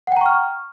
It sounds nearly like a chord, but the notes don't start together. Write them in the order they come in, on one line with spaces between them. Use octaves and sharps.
F#5 G5 A#5 C#6 F6